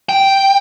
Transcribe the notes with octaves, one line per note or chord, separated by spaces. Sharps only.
G5